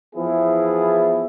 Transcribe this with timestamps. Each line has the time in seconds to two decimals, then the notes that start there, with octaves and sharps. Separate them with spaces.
0.16 E2 F3 B3 E4 G#4